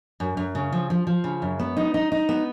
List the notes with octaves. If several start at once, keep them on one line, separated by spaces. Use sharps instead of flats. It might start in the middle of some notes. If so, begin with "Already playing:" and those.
F#2
F#2
C#3
F3
F3
F3
C#3
F#2
B3
D#4
D#4
D#4
B3